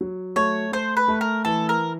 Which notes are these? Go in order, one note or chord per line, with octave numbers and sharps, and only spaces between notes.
F#3
A3 C#5
A3 C5
B4
A3
A#4
E3 A4
A#4